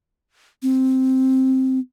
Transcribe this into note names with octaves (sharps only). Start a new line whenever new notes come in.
C4